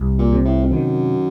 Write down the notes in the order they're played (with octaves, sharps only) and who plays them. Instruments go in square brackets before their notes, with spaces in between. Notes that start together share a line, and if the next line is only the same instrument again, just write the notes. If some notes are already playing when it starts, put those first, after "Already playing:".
Already playing: [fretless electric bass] C2
[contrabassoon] A#2
[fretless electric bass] C3
[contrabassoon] A2
F2
[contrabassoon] F#2 [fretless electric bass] D#3